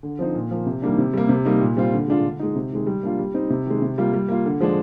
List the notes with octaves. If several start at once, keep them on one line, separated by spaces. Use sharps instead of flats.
D3
F3 C4 D#4
A#2
F3 A#3
C3
D#3 G3 A#3 D4
C3
G3 A#3
C3
G3 A#3 D#4
A#2
G3 C4 F4
D3
G#3 D4 F4
D3
G#3 D#4
C3
D#3 G#3
G3
A#3 D4 F4
G3
C4 D#4
C3
D#3 G#3
C3
G3 A#3 F4
G3
A#3 F4
D3
F3 G#3 D4